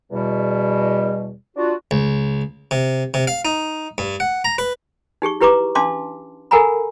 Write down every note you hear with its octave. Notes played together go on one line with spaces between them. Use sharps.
E2 B2 G3
D4 F4 F#4
C#2
C3
C3
F5
D#4
G2
F#5
A#5
B4
D#4 G4 G#4 C#6
E4 G4 B4 A#5 C#6 D6
C#4 D4 F5 A5 C6 D6
A4 A#4 F#5 G#5 A#5 B5